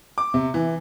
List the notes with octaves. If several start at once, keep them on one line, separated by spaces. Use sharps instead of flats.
D6
C3
E3